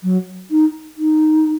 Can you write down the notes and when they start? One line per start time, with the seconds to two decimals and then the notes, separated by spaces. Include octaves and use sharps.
0.03 F#3
0.51 D#4
0.98 D#4